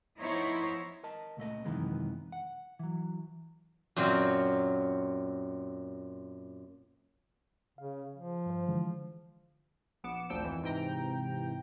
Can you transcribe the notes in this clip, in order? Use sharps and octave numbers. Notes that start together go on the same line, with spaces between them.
F3 B3 D#4 E4 C5 C#5
A#4 D#5 A5
C#2 A#2 A3 D#5
F#2 C3 D#3 E3 G#3 B3
F#5
E3 F#3
F#2 A#2 F#3 C4
C#3 F5
F3
G2 C5
D3 E3 G#3
A#1 B3 D6 C#7 E7
G#1 D2 A#2 F3 G5 E6
F2 E3
G#2 C3 E3 G5 A#5